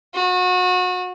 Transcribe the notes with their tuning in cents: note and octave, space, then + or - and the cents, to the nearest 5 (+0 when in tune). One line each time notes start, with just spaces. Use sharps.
F#4 -30